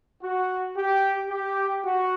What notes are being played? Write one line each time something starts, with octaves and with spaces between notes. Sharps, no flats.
F#4
G4
G4
F#4